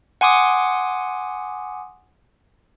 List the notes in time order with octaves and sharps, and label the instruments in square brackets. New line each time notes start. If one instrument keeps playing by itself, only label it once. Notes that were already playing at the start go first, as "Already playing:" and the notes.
[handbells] F#5 G#5 C6 D6 D#6